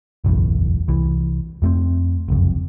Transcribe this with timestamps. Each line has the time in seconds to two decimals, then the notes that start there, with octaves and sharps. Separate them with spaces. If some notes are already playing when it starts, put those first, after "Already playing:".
0.24 F#1 B1 E2 A2
0.88 C2 E3
1.62 F2 A3 C4
2.28 F#1 C2 F2